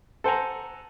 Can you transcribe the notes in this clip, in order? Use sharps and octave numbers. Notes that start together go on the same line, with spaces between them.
A4 C5 F#5 G#5 A#5